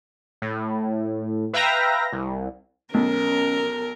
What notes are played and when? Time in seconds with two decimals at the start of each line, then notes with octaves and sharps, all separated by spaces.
0.42 A2
1.53 B4 E5 F5 G5 A#5 A#6
2.13 C2
2.94 B1 C#4 A#4